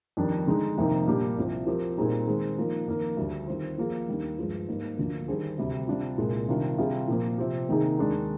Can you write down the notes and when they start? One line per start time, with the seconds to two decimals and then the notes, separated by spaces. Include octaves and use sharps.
0.17 F2 D#3 G3 D4
0.47 D3 G#3 D#4
0.78 F2 C3 D#3 A#3 D#4
1.07 A#2 G3 A#3 D4 G4
1.37 C2 C3 F3
1.67 F3 C4 G4 A#4
1.98 A#2 G3 C4 D#4 G#4
2.27 D#3 G#3 C4
2.58 F3 A#3 D#4 A#4
2.87 F2 D#3 A#3 D#4 A#4
3.17 D2 D3 G3 D4
3.47 D#3 G3 C4 F4 C5
3.78 F3 A#3 F4 G#4
4.08 D#2 D#3 G3 A#3 D4
4.38 G2 F3 G#3
4.68 G#2 G3 A#3
4.97 D2 D3 F3 A#3
5.28 D#3 G3 D4 G#4 C5
5.58 D2 C3 G3
5.88 C3 G3 D4 F4
6.18 C2 A#2 G#3
6.48 C3 D#3 G3 D4 F4
6.78 C3 G3 D4 F4 G#4
7.08 A#2 F3 A#3
7.38 C3 F3 C4 G4
7.69 C3 D#3 A#3 D#4 G#4
7.98 D#2 D#3 G#3 D4